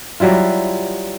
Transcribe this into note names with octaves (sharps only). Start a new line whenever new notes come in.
F#3 G3 E4 F4